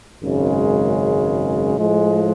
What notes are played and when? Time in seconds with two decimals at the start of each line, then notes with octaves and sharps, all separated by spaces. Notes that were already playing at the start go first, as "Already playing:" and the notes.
0.22 G#1 F#2 C#3 G#3
1.77 A2 F3 G#3